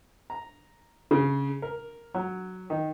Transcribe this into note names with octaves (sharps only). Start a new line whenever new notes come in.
A#5
C#3
A#4
F#3
D#3